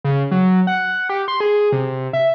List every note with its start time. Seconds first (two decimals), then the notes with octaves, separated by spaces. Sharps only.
0.04 C#3
0.31 F#3
0.67 F#5
1.09 G4
1.28 C6
1.40 G#4
1.72 C3
2.13 E5